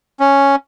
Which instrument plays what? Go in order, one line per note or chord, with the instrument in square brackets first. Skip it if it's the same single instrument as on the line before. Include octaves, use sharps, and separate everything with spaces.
[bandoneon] C#4